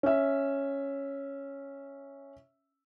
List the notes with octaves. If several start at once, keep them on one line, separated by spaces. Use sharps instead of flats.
C#4 E5